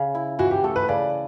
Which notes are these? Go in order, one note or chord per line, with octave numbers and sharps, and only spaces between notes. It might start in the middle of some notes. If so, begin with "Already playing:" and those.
Already playing: C#3
E4
E3 F#4
G4
A3 A4
B4
C#3 D5